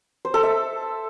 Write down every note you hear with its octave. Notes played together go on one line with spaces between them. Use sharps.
C5
A4
E5